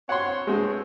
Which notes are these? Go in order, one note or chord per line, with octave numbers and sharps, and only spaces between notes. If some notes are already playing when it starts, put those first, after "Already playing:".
C4 F#4 C#5 F#5 C6
G2 G#3 A3 C4